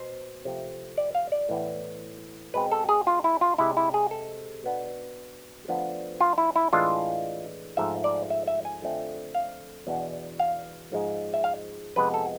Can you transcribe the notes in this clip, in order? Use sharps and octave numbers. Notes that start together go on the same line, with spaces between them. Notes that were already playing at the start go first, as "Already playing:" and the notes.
Already playing: B2 C5
C3 F3 A3 C4
D5
F5
D5
A2 E3 B3
B2 G#3 C4 B4
A4
G#4
F4
E4
F4
C3 G#3 C4 E4
E4
G#4
A4
B2 B3 D4
D2 D3 F3 B3 D4
F4
E4
E4
A2 E3 G#3 D4 F4
G#2 F3 A3 E5
D5
E5
E5
G#5
F2 D3 F3 A3 C4
F5
E2 B2 B3 D4
F5
G#2 F3 G#3
E5
F5
F2 C3 G#3 B3 B4
A4